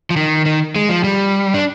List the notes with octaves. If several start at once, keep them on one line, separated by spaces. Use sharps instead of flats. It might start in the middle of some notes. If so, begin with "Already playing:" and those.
F3
D#3
D#3
G#3
F3
G3
D4